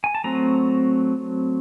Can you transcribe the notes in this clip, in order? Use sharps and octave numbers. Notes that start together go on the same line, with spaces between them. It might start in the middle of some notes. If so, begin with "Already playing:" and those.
G#5
A5
F#3 A3 C4 A#5